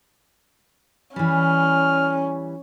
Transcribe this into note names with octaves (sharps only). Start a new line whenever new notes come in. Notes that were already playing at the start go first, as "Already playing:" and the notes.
E3 G3 C#4 F6